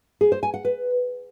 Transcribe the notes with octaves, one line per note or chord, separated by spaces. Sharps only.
G#4
C5
G#5
F#5
B4